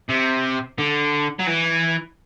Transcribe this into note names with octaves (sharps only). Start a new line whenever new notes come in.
C3
D3
F#3
E3